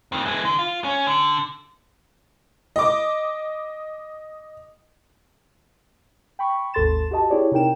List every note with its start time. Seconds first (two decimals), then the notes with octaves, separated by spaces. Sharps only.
0.12 F2 D#3
0.25 E3 G#3
0.45 D3
0.59 F4
0.84 C#4
1.07 D3
2.76 D#5 D6
6.39 G5 B5 C#6
6.74 G#1 D#2 A4 C6 A6 E7
7.11 F#4 G4 D#5 A5
7.30 E4 G4 G#4 C#5 D5
7.52 C3 D#4 A#4 G5 E7